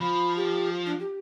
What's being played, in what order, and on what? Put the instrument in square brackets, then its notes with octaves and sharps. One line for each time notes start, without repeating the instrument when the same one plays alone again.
[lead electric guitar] F3 [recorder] B5
[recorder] G4
D4
G4